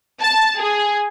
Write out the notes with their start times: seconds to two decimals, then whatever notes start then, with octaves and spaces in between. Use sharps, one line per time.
0.21 A5
0.58 G#4